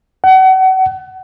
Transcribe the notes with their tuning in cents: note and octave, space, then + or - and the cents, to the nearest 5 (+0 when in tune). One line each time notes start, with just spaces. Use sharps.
F#5 +35